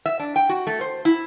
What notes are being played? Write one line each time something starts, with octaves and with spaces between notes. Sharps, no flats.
E5
D4
G5
F#4
A3
C5
E4